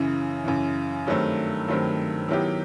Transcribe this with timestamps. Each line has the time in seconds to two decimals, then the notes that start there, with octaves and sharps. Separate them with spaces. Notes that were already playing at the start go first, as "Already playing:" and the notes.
Already playing: F#2 C#3 E3
0.44 F#2 C#3 E3
1.07 G2 D#3 F#3 A3 C4
1.68 G2 D#3 F#3 A3 C4
2.29 D#3 F#3 B3 E4 G4